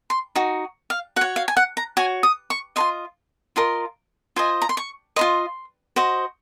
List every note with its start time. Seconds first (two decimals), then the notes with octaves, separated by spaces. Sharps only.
0.10 C6
0.36 D#4 F#4
0.90 F5
1.16 F#4 F#5
1.21 C#5
1.36 F5
1.48 G#5
1.57 F#5
1.77 A#5
1.97 F#4 C#5 G#5
2.23 D#6
2.50 C#6
2.76 F4 A#4 D#5 C6
3.56 F4 A#4 D#5 C6
4.36 F4 C5 D#5 G#5
4.62 A#5
4.69 C6
4.77 C#6
5.16 F4 C5 D#5 C6
5.96 F#4 C5 D#5